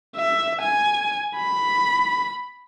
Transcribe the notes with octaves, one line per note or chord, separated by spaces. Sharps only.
E5
G#5
B5